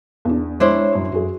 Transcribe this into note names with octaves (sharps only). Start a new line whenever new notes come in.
E2 D4
G#3 D4 E4 C5 C#5
F#2 C#5
F#2 F#4 G#4